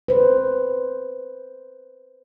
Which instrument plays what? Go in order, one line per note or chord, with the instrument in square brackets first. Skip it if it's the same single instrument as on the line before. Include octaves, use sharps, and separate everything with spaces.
[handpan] B4 C5